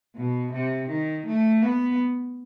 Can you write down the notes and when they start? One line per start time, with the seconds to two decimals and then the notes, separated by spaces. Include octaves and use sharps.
0.15 B2
0.53 C3
0.89 D#3
1.26 A3
1.62 B3